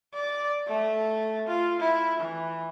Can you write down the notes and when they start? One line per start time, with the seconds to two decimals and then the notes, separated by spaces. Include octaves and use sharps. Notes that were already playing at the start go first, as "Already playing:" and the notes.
0.14 D5
0.67 A3
1.48 F4
1.80 E4
2.19 E3